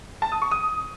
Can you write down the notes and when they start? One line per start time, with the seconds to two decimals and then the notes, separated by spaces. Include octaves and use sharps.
0.22 A5
0.32 D#6
0.42 C#6
0.51 D#6